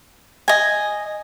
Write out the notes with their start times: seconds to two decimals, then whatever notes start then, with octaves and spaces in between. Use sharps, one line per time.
0.48 D#5 G#5